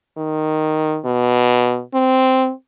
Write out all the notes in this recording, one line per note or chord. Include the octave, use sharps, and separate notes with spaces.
D#3
B2
C4